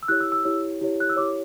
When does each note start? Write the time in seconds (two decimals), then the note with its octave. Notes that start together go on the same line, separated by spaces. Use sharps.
0.03 E6
0.08 E4 G4 C#5 F#6
0.20 E6
0.32 E6
0.45 E4 G4 C#5
0.81 E4 G4 C#5
1.00 F#6
1.09 E6
1.16 E4 G4 C#5 D6